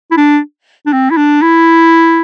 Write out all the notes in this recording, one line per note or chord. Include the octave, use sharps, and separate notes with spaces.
E4
D4
D4
C4
E4
D4
E4